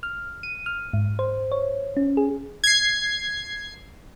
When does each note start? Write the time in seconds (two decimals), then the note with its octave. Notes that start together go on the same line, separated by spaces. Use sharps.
0.03 F6
0.43 D#7
0.66 F6
0.93 G#2
1.19 C5
1.52 C#5
1.97 C#4
2.17 G#4
2.64 G#6 C7